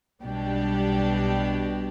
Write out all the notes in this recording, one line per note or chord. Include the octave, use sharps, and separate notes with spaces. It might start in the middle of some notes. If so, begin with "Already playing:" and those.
B1 B2 G3 D4 G4